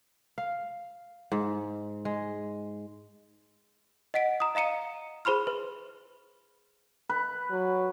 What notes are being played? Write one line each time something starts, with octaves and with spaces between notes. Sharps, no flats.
F5
G#2
G#3
D#5 F#5 B6 D7
A#5 D#6
D#5 F5 A#5 C#7 D#7
G#4 C5 B5 C6 F6
B4
B4
F#3